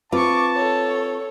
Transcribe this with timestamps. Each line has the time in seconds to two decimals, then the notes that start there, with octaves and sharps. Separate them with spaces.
0.12 C4 F4 B4 A5 C#6 D6
0.56 A4 C#5